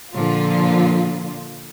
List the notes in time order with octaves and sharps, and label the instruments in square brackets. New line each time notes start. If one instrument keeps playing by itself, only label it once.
[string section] A#2 D3 F3 F4